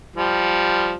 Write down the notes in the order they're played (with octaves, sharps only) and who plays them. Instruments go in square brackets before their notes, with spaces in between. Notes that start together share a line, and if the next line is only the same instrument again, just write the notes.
[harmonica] F3 G3